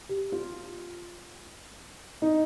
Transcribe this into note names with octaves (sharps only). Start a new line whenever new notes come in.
G4
F4
D#4